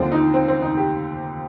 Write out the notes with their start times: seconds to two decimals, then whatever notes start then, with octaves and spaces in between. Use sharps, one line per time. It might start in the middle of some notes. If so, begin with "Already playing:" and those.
Already playing: D#2 D3 F3 C4
0.12 D#4
0.34 C4
0.48 C4
0.62 D#4
0.77 G4